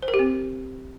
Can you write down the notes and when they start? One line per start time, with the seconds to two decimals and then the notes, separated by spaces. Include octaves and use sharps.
0.02 C5
0.08 A#4
0.14 G4
0.19 C4